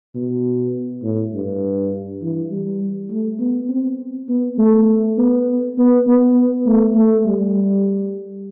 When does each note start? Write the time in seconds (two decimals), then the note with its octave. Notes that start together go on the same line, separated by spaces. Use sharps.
0.15 B2
1.02 A2
1.33 G2
2.22 E3
2.51 G3
3.10 A3
3.39 B3
3.70 C4
4.29 B3
4.58 A3
5.18 B3
5.78 B3
6.07 B3
6.66 A3
6.96 A3
7.26 G3